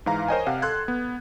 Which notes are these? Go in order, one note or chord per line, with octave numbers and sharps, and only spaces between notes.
G#2 E3 F5 A#5
A#4 C5 C#5 D#5 G5 G#5
C3 F5 F#5
A4 C6 F#6 G#6
B3